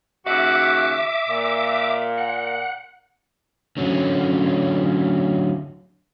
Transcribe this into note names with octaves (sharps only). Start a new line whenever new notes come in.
D#2 C#3 F#4 E5 D6
A#2
F#5
D3 F#3 C#4